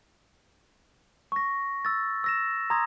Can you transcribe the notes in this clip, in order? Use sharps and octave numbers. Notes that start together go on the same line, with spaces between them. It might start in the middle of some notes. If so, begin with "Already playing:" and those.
C#6 A#6
E6 A6
E6 A#6 E7
A#5 C6 D#6 G#6 A#6